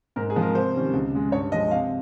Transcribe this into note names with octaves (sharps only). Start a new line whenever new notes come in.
G#2 A#4
G#4
F3 G#3 C4
A#4
C3 C5
D#3 G3 C#4
C#2
C#3 G#3
G2 C#5
F3 G#3 D#5
C3 F5